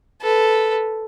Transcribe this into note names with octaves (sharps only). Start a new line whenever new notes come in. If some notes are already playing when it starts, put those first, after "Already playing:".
A4 B4